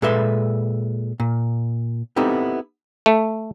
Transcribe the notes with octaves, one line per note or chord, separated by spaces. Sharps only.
A#2 G#3 A4 B4 E5 C6
A#2
B3 C4 D#4 E4 G4 A4
A3